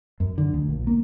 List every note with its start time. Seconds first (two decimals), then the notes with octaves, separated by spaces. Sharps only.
0.20 F#2
0.38 D3
0.54 D2
0.69 A#1
0.87 A#3